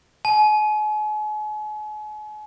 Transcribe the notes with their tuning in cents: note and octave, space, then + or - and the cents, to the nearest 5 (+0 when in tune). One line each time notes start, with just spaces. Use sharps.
G#5 +40